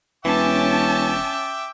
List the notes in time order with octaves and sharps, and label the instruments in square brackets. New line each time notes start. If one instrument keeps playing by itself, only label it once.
[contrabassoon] E1 [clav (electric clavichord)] E3 [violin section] C#4 A5 [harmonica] E5 G5 D6